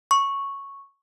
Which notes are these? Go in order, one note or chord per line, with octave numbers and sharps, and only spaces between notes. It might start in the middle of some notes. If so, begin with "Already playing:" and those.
C#6